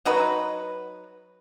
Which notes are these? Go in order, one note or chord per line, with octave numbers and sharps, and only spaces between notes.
F#3 D#4 F#4 B4